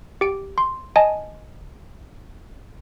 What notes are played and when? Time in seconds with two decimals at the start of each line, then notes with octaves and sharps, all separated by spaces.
0.21 G4 D7
0.58 C6
0.96 D#5 G#5 A5